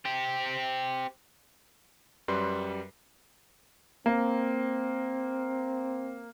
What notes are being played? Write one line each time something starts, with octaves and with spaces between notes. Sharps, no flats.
C4 G4
F#2 G3 B4 C6 C7
A#3 C4